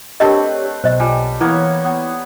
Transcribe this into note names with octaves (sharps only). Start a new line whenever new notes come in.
A3 C4 D4 G4 A#4 B4 C#5 D#5
B1 C5 D#5
G3 F4 G#5
E3 A#3 B3 C#5
B3